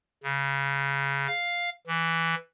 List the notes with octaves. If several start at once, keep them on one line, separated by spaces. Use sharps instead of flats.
C#3
F5
E3